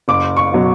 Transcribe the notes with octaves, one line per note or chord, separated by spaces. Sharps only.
F#1 D6
C#6
B2 F#3